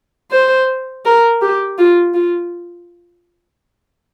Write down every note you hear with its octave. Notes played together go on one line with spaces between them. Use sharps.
C5
A#4
G4
F4
F4